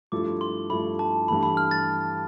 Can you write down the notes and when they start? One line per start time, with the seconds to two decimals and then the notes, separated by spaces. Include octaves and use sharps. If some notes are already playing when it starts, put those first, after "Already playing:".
0.12 G2 F3 A3 E4 A4 D6
0.41 C6
0.70 G2 F3 A3 E4 A4 B5
0.99 A5
1.28 G2 E3 A3 B5
1.43 B5
1.57 F6
1.71 A6